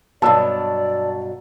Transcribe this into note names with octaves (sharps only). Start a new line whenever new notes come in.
G2 B2 F#3 D5 A5 E6